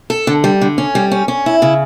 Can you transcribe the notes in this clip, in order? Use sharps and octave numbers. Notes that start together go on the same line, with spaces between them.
A4
D3
G3
D3
C#4
G3
C#4
C#4
E4
C#3